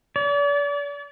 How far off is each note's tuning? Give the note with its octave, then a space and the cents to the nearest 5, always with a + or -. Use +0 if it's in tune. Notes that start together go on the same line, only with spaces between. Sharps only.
D5 -40